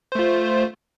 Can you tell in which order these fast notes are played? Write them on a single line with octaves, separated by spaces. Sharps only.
C5 A3 F4